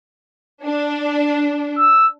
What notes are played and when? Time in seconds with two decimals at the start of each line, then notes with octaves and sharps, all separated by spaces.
0.65 D4
1.79 E6